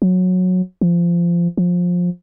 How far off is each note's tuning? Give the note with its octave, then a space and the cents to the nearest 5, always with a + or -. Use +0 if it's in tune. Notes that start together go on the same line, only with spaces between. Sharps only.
F#3 -15
F3 -20
F3 +20